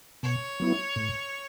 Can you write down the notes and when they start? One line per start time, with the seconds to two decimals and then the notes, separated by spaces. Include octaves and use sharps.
0.23 B2 C#5
0.60 F#3 B3 E4
0.96 A2